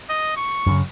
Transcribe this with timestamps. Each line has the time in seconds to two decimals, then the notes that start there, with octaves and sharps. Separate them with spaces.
0.09 D#5
0.37 C#6
0.67 F#2 C#3